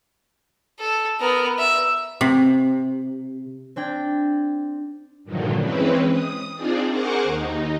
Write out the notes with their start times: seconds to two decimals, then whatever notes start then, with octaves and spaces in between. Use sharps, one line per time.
0.80 A4
1.21 B3 A#4
1.59 E5
2.21 C3
3.76 C4 D4 G5 G#6 A6
5.24 G2 A#2 D3 D#3 F3 F#3
5.58 E3 G#3 C4 C#4 B4
6.09 D#6
6.55 C4 D4 D#4 F4 G#4 D5
6.89 G#4 A#4 C5 F#5 C#6 D6
7.23 D#2 D#4